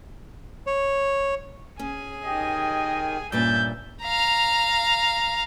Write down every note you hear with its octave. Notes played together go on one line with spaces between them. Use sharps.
C#5
C#4 G#4 G#5
D#3 G4 D#5
G2 A#2 C#4 E5 G6 A6
F5 A#5